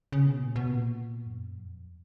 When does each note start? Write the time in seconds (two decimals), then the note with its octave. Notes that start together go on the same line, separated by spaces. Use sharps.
0.12 C#3
0.26 B2
0.41 A#2
0.56 B2
0.70 A#2
1.26 F#2
1.55 F2